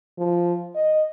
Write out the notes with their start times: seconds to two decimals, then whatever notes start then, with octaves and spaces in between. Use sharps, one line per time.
0.18 F3
0.75 D#5